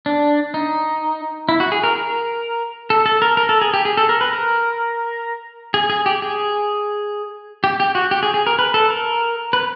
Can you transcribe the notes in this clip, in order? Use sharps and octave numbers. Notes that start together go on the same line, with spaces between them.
D4
D#4
E4
F#4
G#4
A#4
A#4
A4
A4
A#4
A#4
A4
G#4
G4
G#4
A4
A#4
B4
A#4
G#4
G#4
G4
G#4
G4
G4
F#4
G4
G#4
G#4
A#4
B4
A4
A#4
B4